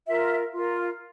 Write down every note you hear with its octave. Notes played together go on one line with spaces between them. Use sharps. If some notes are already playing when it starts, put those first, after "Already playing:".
F4 A#4 E5
F4 A#4